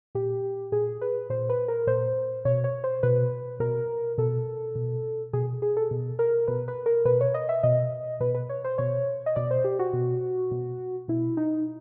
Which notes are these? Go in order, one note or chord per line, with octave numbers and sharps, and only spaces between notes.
A#2 G4
A#2 G#4
B4
A#2 C5
B4
A#4
A#2 C5
B2 C#5
C#5
C5
B2 B4
B2 A#4
B2 A4
B2
B2 G#4
G#4
A4
B2
A#4
B2 B4
B4
A#4
B2 B4
C#5
D#5
E5
B2 D#5
B2 B4
B4
C#5
C5
B2 C#5
D#5
B2 D5
C5
G4
F#4
B2
B2
B2 E4
D#4